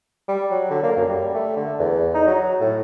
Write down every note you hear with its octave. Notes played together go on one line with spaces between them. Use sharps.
G3
F#3
D3
A#3
F#2
G3
A3
D3
E2
D#4
F#3
A2